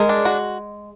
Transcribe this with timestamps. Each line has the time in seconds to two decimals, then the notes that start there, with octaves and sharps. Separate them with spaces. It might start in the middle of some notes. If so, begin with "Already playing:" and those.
Already playing: G#3 A#4
0.09 D4
0.25 F#4